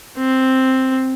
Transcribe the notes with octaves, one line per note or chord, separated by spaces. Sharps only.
C4